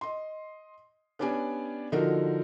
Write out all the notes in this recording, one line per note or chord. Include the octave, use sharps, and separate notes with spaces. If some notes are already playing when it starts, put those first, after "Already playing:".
D#5 C6
B3 C#4 D4 G4 D5 G#5
D3 F3 D#4 F#4 A#4